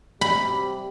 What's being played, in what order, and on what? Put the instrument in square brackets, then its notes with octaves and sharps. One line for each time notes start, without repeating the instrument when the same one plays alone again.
[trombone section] C3 G3 [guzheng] B5